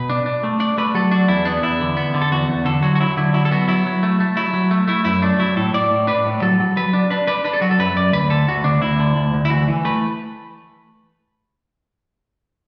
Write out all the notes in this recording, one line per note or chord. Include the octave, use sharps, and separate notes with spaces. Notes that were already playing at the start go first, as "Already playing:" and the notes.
Already playing: B2 B4
D4
D4
A3
D4 D5
A3 B4
F#3 A4
D4 F#4
E2 E4
B3 D4
E2 E4
D3
B3
D3
A4
E2 F#4
E2
D3 A4
F#3 F#4
F#4
F#3 E4
D3 E4
F#3 E4
A4
B3 F#4
F#3 E4
F#3
A3
A3
F#3 E4
F#3
A3
A3 E4
F#2 E4
A3 D4
F#3 E4
A2 A4
A2 D5
A2
D4 B4
A2
F#3 A4
F#3
F#3 B4
D4
D4 B4
D4 B4
D4 B4
A4
F#3 F#4
A4
F#2 B4
F#2 D5
D2 B4
D3 A4
D2 F#4
D2 D4
D2 E4
D3
D2
D2
E4
E3 F#4
E3
A3 B4